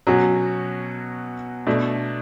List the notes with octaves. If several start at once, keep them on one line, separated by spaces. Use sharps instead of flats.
B2 F#3 C#4 F#4
B2 A3 D4